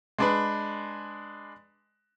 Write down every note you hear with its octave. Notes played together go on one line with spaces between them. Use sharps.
G#3 D4 B4